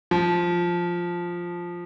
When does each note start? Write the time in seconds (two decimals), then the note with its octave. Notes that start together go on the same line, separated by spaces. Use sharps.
0.11 F3